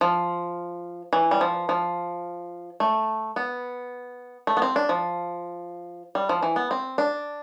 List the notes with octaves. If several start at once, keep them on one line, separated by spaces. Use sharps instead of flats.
F3
E3
G3
F3
F3
A3
B3
A3
B3
C4
D4
F3
G3
F3
E3
B3
C4
D4